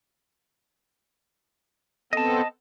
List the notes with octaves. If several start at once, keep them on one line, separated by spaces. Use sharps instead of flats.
B3 C4 A4 D#5 A5